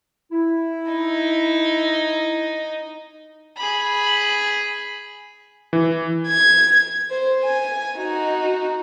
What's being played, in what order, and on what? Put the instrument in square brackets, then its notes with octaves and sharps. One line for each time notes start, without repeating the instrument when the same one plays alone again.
[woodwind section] E4
[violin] D#4
[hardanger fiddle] G#4 B5
[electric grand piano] E3
[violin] G#6
C5
G#5
D#4 F#4